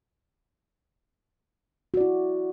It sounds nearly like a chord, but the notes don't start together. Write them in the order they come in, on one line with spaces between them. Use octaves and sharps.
F#4 D5 E4